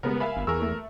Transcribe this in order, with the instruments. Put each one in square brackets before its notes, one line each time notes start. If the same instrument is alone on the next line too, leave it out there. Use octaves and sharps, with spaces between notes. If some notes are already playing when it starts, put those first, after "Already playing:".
[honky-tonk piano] C#3 G3 G#3 [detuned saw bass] B3 [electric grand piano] A#4
[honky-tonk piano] A#4 G#5 [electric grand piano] E5 F5 B5
[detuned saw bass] G1
[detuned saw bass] E2 [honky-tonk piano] G#4 C#6 [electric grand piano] A#4 E6
[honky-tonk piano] A3